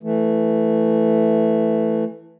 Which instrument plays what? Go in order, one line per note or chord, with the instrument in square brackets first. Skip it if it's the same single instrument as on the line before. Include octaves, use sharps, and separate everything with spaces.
[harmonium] E3 A3